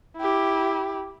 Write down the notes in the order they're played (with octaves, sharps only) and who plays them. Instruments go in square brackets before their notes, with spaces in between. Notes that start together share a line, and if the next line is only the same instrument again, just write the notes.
[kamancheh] E4 G4